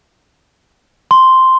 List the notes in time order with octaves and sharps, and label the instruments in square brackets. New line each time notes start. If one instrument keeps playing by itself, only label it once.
[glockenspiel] C6